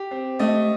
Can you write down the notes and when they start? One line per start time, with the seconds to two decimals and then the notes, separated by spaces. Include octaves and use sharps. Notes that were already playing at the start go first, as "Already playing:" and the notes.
Already playing: G4
0.11 C4
0.39 A3 D#5